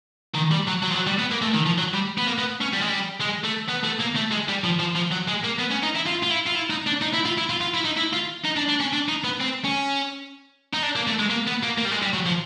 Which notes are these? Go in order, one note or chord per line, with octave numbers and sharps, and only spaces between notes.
D#3
G3
F#3
F#3
F3
F#3
G3
B3
A#3
A3
D#3
F3
F#3
G3
B3
A#3
B3
C#4
G3
G#3
G3
G#3
A3
B3
A3
A#3
A3
G#3
G3
F3
F3
F3
F#3
G#3
A#3
B3
C#4
D#4
E4
F4
F4
E4
F4
E4
D#4
D4
D#4
E4
F4
E4
F4
F4
E4
D#4
E4
F4
D#4
D4
D4
C#4
D4
D#4
B3
C4
C#4
D#4
D4
A#3
A3
G#3
A#3
B3
A#3
A#3
G3
G#3
G3
F#3
F3